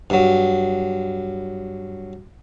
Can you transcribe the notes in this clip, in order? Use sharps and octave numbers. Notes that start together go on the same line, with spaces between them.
G2 F#3